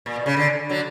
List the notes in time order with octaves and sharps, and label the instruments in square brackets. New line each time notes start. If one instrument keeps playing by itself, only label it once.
[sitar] A#2
B2
C#3
D3
D3 F#3